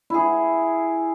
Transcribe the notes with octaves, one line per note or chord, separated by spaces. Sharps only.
E4 G#4